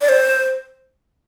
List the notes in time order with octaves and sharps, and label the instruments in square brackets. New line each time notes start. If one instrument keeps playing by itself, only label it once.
[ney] D5
C5